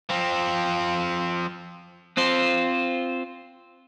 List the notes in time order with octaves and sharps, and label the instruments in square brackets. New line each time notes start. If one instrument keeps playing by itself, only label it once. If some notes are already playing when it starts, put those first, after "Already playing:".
[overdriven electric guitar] F3 C4
[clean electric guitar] C4 F4 C5